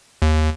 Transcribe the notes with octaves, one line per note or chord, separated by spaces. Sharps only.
D#2